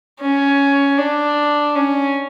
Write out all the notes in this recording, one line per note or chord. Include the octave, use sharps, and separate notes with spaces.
C#4
D4
C#4